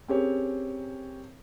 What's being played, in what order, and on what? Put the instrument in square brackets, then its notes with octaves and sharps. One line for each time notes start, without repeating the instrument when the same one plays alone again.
[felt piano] C4 C#4 G4 G#4 A#4 C#5